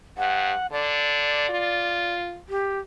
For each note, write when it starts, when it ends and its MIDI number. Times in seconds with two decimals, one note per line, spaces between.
0.18 0.52 43
0.18 0.67 78
0.72 1.48 50
0.72 2.13 74
1.49 2.39 65
2.49 2.79 67